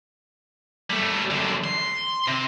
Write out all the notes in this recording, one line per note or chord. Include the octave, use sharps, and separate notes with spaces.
G3 A3
F#2 D3
C6
C3 C4